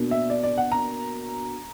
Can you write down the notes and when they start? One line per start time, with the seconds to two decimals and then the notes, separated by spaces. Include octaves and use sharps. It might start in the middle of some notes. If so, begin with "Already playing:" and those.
Already playing: B2 A#3 D4
0.11 E5
0.30 D5
0.43 D5
0.58 F#5
0.72 A#5